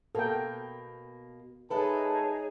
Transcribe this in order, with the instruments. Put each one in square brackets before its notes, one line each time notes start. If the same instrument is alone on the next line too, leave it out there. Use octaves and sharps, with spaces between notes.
[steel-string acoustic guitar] B2 A#3 [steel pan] A4 A#4 G5
[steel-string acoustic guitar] G#3 A4 B4 [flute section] D#4 G#4 C#5 [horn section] E5 A5